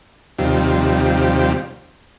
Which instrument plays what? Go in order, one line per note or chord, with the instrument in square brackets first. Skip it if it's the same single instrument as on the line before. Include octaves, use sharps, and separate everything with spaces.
[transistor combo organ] D#2 C3 F3 G3